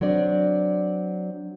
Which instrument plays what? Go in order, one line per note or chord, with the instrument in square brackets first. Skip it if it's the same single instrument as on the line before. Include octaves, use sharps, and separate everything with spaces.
[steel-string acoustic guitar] F#3 C4 D4 D5